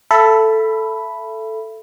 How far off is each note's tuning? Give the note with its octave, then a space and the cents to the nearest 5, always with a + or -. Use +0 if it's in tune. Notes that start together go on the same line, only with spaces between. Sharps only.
A4 +0 E5 +30 B5 +0